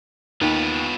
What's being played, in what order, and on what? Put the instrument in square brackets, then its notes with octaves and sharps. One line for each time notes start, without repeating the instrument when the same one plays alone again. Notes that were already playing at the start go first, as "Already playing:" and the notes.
[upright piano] D#2 [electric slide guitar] B3 F4 B4